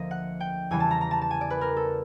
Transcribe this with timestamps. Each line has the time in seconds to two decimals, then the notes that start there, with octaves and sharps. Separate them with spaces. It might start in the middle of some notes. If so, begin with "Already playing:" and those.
Already playing: D2 D3 F3 A#3 D#5
0.11 F#5
0.40 G5
0.71 E2 C#3 E3 G3 G#5
0.80 A5
0.91 A#5
1.01 A#5
1.11 A5
1.22 A5
1.31 G#5
1.41 D5
1.50 B4
1.61 A#4
1.77 A4